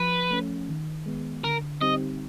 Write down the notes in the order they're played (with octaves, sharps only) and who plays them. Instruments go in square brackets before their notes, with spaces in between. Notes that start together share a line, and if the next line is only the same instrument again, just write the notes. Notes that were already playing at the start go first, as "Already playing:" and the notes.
Already playing: [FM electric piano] F3 [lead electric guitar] B4
[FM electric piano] A3 C#4
D#3
G#3 B3
[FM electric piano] D3 [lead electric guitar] A#4
[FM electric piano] G3 C4 D#4 G4 [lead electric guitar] D#5